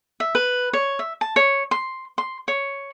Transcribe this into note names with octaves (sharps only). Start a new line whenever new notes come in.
E5
B4
C#5
E5
A5
C#5
C6
C6
C#5